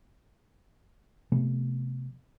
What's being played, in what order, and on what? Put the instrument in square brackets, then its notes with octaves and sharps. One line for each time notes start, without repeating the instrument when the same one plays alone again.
[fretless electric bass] C3 F3 A3 B3